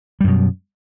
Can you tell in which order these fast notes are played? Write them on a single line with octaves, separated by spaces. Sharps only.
G3 F#2 B2